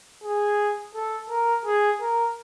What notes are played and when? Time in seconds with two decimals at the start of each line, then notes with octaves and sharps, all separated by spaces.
0.24 G#4
0.95 A4
1.30 A#4
1.66 G#4
2.01 A#4